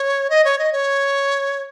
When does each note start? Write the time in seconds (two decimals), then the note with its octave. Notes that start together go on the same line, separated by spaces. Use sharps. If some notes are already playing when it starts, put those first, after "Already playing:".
Already playing: C#5
0.30 D#5
0.44 C#5
0.59 D#5
0.73 C#5